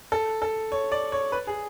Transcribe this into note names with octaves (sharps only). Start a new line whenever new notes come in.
A4
A4
C#5
D5
C#5
B4
G#4